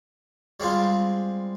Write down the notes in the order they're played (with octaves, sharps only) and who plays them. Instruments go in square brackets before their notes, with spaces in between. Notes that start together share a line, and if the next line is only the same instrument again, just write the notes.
[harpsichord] G3 G#3 C4 F4